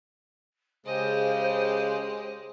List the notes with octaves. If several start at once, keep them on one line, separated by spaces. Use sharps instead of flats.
C#3 G#3 G4 C5 D#5